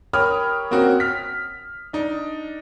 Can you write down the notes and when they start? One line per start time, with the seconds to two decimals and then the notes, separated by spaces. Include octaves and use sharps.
0.13 G4 A#4 C#5 B5 D#6 F6
0.71 A#3 C4 C#4 F#4 A#4
1.00 F6 B6
1.93 D4 D#4